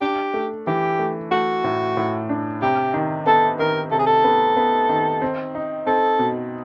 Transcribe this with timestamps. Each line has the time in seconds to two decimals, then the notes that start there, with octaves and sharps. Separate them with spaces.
0.01 D4 G4
0.34 A3
0.67 E3 G4
0.99 A3
1.31 A3 F#4
1.64 A2
1.97 A2
2.29 D4
2.62 C3 G4
2.94 D#3
3.26 B3 A4
3.59 D#3 A#4
3.91 C3 A4
3.99 G#4
4.06 A4
4.24 B3
4.56 B3
4.89 D#3
5.22 C4
5.55 D#4
5.87 C4 A4
6.19 B2